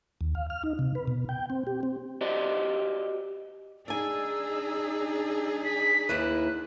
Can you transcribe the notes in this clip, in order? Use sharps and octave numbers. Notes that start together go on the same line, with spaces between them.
D#2
F5
F6
D#4
C3
B4
B2
G5
C4
G4
C4
F#4 G4 C5 D5 D#5
D4 D#4 G#4 D5 G#5 E6
B6
D#2 E4 B4 F#6